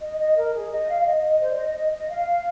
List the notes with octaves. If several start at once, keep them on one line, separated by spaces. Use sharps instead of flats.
D#5
D#5
A#4
G#4
D#5
F5
F5
D#5
D#5
C5
D5
D#5
D#5
D#5
F5